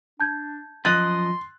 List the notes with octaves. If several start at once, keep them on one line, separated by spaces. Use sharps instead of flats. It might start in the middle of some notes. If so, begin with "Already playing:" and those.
D4 A5 G6 G#6
F#2 F3 D#5 C6 F#6 A6